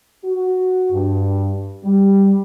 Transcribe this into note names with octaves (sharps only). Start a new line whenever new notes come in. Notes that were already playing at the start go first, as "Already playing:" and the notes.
F#4
G2
G3